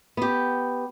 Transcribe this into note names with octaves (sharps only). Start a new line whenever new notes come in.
B3 G4